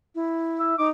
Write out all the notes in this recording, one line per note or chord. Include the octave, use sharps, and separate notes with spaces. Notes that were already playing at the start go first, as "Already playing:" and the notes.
E4
E5
D#4 D6